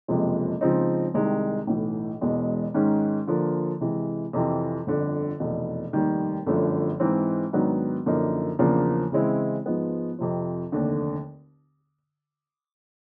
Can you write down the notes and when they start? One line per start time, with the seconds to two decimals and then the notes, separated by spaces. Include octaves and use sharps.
0.08 F#1 F2 C3 F3 G#3
0.61 C#3 F3 G#3 C4 D#4
1.14 C2 C3 D#3 G#3
1.67 B1 A2 E3
2.21 E1 E2 B2 G#3
2.74 G#2 D#3 G#3 C#4
3.27 D3 F3 A#3
3.80 C3 E3 G#3
4.33 F2 C3 E3
4.87 G1 F2 D3
5.40 F1 E2 B2
5.93 F1 D#2 D#3 G3
6.46 G1 F#2 D3 F3 A3
7.00 G#2 E3 G#3 C4
7.53 G#2 D#3 F#3 B3 D4
8.06 F#2 D3 F3 A#3 D#4
8.59 E2 C#3 F3 A#3 D4
9.12 C#3 E3 G#3 C4 E4
9.66 G#2 F3 G#3 B3
10.19 F2 C3 F3
10.72 F1 D#2 D3